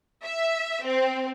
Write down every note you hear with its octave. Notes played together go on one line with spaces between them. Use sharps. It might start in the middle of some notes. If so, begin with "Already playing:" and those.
E5
C4